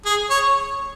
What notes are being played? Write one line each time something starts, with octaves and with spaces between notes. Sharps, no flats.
G#4
C#5